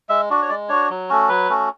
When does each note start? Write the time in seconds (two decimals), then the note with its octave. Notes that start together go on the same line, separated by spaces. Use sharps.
0.09 G#3 E5
0.30 D4 F#4
0.42 C#5
0.49 G#3 D5
0.69 D4 F#4 C#5
0.90 F#3
1.09 A3 C#4 F#4
1.29 F#3 B4
1.49 A3 C#4 F#4